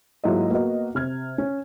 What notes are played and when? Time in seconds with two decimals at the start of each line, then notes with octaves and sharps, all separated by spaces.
0.24 G#2 F#3 A#3 E4 F4 D#5
0.51 A#3 B3 F#4 D#5
0.95 C3 F6 G#6
1.38 C#4